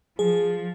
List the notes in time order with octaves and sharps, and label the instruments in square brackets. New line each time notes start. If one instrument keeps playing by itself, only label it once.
[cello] F3 [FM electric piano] G#4